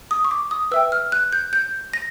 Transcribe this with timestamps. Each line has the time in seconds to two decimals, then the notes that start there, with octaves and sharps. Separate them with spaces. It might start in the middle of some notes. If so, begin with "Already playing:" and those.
0.11 D#6
0.25 C#6
0.31 D6
0.51 D#6
0.71 B4 E5 G5 E6
0.92 F6
1.12 F#6
1.33 G6
1.53 G6
1.93 A#6